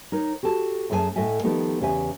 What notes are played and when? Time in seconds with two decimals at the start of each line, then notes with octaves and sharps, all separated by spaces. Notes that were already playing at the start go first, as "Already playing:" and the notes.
0.12 D#4 A#4 C#5
0.43 F#4 G4 A4 A5
0.90 F#2 A3 G#4 A#4 G#5 A5
1.16 A2 A3 A4 D#5 E5 G#5
1.43 D#3 F3 A3 B3 D#4 G4
1.80 E2 C#3 G4 E5 G#5